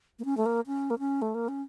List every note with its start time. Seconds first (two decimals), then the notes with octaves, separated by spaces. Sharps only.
0.19 A#3
0.25 C#4
0.37 A3
0.46 A#3
0.67 C#4
0.90 A#3
0.99 C#4
1.22 A3
1.35 A#3
1.48 C#4